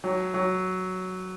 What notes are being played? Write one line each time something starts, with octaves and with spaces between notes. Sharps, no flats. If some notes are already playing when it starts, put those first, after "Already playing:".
F#3
F#3